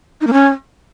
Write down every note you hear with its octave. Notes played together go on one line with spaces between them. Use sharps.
D#4
A#3
C#4